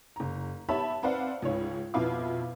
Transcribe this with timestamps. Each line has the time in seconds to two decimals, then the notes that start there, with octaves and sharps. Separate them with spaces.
0.16 F#1 A#5
0.69 B3 G4 C#5 E5 A5 B5
1.03 C4 B4 C5 D5 F5 F#5
1.42 C#2 G#2 C#5
1.94 F2 B2 E4 B4 F5 D6